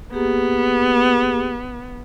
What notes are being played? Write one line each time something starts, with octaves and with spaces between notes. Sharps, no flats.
A#3 B3 G4 G#4